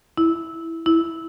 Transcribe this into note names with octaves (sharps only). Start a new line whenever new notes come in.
E4
E4